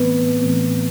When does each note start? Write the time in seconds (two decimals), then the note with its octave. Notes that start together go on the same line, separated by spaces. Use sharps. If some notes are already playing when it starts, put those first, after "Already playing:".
Already playing: A2 E3 A3 B3 C4 B4
0.41 A2 E3 A3 C4